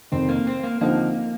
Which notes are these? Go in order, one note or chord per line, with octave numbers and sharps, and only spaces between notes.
F1 F2 D#3 C4
A#3
C4
A#3
D#2 D3 F3 A#3 C4 D#4